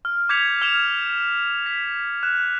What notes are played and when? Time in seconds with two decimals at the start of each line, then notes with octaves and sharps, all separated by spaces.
0.05 F6
0.29 D6 G6 G#6 B6 C#7 F7
0.62 F6 G#6 E7 F7
1.66 B6
2.23 F#6 E7